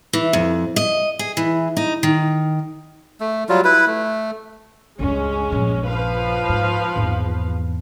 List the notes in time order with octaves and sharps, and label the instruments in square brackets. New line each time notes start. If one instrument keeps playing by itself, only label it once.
[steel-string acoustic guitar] E3
F2
D#5
G#4
E3
D#4
D#3
[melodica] A3
F#3 G3 F4
E4 B4
A3
[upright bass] C#2 G2 [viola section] G#3 C#4
[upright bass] A#1 G2
[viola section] F3 B4 F5
[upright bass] G#2
G#1 E2